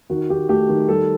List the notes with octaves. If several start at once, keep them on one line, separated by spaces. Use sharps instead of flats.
D#3 F#4
D#3 G4
A3 G4
D#3
G3 A4